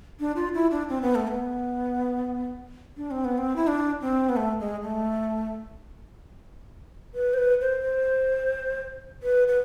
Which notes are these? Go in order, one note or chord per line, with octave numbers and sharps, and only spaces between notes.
D4
F4
E4
D4
C4
B3
A3
B3
D4
C4
B3
C4
E4
D4
C4
B3
A3
G#3
A3
B4
C5
B4
C5
C5
B4
B4